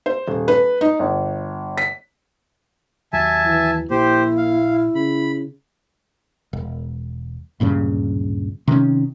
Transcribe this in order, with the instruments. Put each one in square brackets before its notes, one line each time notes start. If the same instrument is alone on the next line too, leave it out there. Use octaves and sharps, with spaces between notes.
[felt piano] C5
D#1
B4
D#4
G1
B6
[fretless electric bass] D#2 F#3 [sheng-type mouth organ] E5 G#5 A5
[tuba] E3
[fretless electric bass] A#1 [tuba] A#3 [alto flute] E4 [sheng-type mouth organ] G4 C5
[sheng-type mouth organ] F5
[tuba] C#3 [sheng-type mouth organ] B5
[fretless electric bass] E1
D1 G2 A#2 C#3
C3 D#3 G3 C#4